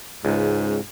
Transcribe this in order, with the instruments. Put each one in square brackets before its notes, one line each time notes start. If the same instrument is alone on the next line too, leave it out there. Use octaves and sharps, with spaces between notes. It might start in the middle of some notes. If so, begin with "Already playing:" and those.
[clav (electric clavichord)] C#2 [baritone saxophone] G#2